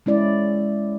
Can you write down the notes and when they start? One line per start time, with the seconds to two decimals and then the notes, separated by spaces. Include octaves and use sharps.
0.06 G#3 C#4 E4 D5